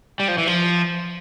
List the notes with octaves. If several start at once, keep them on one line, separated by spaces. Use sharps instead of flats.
G3
F3
E3
F3